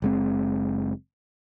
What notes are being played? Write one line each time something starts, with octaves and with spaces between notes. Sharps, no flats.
F#1 G#3 C4